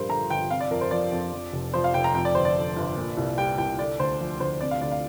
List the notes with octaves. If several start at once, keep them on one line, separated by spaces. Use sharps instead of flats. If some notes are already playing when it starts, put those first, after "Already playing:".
Already playing: A#1 G2 G3 A#4 C5
D3 A#5
G1 G5
C3 F5
D5
F2 A#4
C5
F3 D5
F2
F2
F1
F3 C5
F5
F1 G5
A#5
F2 G5
D5
G1 C5
D5
D3
G1
A#2
C2
G3 G5
C2 G5
D3 D5
D2 C5
F3
D2 C5
C3 D5
F5
D2 D5
F5